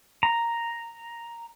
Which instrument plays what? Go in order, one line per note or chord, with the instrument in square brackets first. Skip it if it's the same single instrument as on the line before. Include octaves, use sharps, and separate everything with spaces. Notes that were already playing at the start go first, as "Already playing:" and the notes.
[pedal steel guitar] A#5